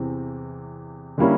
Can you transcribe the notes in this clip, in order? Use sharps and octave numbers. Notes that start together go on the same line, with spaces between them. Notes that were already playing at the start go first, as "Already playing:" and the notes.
Already playing: E2 C3 E3 C4
D3 G3 A#3 C#4 E4